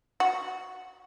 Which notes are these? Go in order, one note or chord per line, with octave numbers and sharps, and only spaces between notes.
F#4